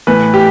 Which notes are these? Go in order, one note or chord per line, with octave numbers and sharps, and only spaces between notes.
A2 E3 A3 B4
G4